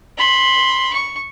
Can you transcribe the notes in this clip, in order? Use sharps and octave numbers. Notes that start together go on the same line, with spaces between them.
B5 C6
C#6